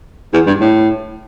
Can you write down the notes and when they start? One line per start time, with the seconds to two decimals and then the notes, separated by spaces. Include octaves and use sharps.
0.33 E2
0.47 G2
0.60 A2